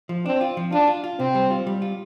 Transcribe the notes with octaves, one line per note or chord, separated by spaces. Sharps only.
F3
C4 D4
F4
F3
D4 F4
F4
F4
C3 C4
G3
F4
G3
F4